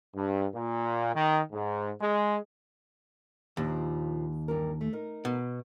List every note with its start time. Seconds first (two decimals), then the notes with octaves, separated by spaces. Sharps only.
0.16 G2
0.55 A#2
1.15 D#3
1.52 G#2
2.01 G#3
3.57 D#2 A#2 F3 D4
4.48 G2 E3 A#4
4.81 A3
4.93 D#4 A#4
5.25 B2